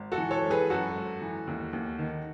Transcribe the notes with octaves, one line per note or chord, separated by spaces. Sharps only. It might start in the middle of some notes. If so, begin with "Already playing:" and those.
Already playing: G#1
F#4 A4
E3
A4 C#5
G#1
G#4 B4
F#2 F#4 A4
G#1
E3
D#2
D#2
D#3